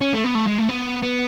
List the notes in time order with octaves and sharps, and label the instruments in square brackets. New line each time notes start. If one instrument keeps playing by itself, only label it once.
[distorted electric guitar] C#4
A3
B3
A3
G#3
A3
B3
B3